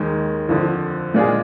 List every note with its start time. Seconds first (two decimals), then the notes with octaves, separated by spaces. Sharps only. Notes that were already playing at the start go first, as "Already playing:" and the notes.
Already playing: D#2 D#3 G#3
0.49 F2 D3 F3
1.14 A#2 G#3 D4 F4 G#4